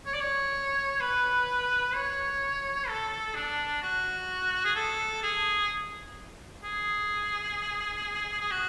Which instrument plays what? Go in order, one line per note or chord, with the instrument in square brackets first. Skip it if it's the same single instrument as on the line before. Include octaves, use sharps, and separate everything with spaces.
[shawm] C#5
D5
C#5
B4
C#5
A4
D4
F#4
G#4
A4
G#4
G#4
G#4
F#4